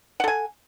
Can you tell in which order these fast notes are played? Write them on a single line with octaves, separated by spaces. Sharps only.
F#5 A4 G#5